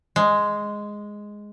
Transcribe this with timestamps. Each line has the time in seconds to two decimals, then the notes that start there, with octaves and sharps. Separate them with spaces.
0.16 G#3